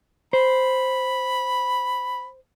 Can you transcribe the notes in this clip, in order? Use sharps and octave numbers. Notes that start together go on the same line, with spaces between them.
C5 B5